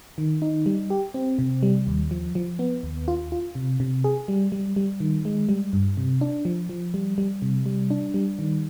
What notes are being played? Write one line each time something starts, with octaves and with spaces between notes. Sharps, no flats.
D#3
D#4
G3
G4
C4
C3
G3
D#2
F3
F3
B3
D#2
F4
F4
C3
C3
G#4
G3
G3
G3
D#3
G#3
G3
G2
C3
D4
F3
F3
G3
G3
C3
G3
D4
G3
D#3